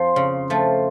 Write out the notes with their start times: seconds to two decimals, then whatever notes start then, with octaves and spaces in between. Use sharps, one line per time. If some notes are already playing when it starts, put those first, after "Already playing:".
Already playing: F2 F3 C6
0.16 C#3
0.50 F3 A3